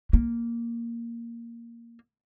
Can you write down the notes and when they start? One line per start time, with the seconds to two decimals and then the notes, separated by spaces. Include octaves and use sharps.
0.13 A#3